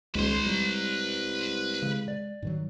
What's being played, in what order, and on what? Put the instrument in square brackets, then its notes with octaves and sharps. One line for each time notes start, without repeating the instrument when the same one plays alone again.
[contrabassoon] D#1 [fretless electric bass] C#2 [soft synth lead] G#3 [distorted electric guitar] B4 C6
[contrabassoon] C2 [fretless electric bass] G3
[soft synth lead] C#3 [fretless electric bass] G#3
[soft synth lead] D5
[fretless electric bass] G#2 D#3 F#3